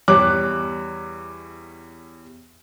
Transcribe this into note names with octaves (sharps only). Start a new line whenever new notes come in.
E2 G3 C#5 D6 F#6